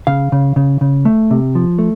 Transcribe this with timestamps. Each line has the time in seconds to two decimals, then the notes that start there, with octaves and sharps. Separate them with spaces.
0.07 C#3 F5
0.32 C#3
0.56 C#3
0.81 C#3
1.05 A3
1.31 C3
1.55 F3
1.79 A3